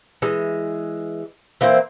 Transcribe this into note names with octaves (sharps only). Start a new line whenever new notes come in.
E3 G#3
E3 A#3 C4 C5